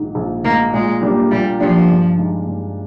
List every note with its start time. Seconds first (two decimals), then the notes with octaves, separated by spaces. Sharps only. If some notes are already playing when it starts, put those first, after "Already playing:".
Already playing: A#1 G#2 D#3
0.15 A#1
0.44 D#3 A#3
0.49 G#2
0.73 A#2 G#3
1.02 G3 A#3 D4 G4
1.31 A#2 G3
1.60 F3 G3 A#3 D4 G4
1.90 G2
2.17 D#3 G#3
2.47 G2